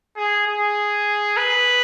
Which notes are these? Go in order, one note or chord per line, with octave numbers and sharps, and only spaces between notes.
G#4
G#4
B4